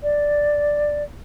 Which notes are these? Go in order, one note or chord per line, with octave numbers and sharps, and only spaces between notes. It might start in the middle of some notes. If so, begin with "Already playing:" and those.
D5